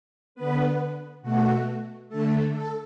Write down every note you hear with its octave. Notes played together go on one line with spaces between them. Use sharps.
D3 B3 B4
B2 A3 F#4
D3 A3 A4
A4